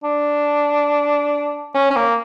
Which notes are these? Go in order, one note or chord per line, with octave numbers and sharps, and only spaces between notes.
D4
C#4
C#4
A#3